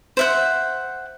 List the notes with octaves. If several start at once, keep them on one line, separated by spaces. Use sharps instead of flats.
C5 E5 F#5